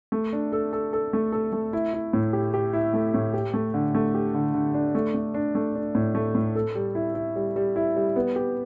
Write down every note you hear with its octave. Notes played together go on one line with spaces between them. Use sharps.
A3
D4
A4
A4
A4
A3
A4
A3
E4
E4
A2
G4
G4
E4
A3
A2
G4
A3
D3
A3
G4
D3
D3
D4
A3
A3
D4
A3
D4
A2
A3
A2
A4
G3
E4
E4
G3
G3
E4
G3
B3
G4